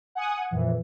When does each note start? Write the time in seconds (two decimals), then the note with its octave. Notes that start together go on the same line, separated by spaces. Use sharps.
0.15 F#5 G#5 D#6
0.51 F2 A#2 E3